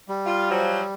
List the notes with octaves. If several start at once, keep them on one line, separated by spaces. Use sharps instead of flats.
G3
F4
F3 F#3